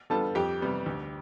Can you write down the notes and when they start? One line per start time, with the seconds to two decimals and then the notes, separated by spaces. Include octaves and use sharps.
0.10 D3 G3 B3 F4 A4 A5
0.35 F2 G4 G5
0.61 C3 G3 B3
0.86 D2